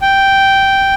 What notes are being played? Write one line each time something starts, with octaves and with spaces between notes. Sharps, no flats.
G5